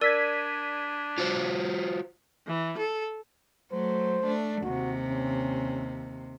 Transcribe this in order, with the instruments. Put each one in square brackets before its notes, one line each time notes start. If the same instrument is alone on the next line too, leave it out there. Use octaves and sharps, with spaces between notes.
[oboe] D4 [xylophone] A#4 D5 E6 [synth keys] G#6 B6 D#7
[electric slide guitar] F4 F#4 C5
[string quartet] E3
A4
[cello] F#3 A3 [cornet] C5
[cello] A3 D4
[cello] D#2 C3 [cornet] F#4
[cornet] C#4